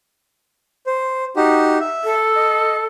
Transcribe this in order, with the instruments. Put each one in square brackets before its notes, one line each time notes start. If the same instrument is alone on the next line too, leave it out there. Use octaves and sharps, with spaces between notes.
[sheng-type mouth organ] C5
D#4 F#4 G4
E5
[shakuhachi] A4
[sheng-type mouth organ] D#5